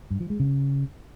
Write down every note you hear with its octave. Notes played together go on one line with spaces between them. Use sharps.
G2
F3
G#3
C#3